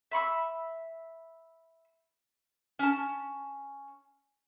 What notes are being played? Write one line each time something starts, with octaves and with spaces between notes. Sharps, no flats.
E5 B5 C#6 E6
C#4 A5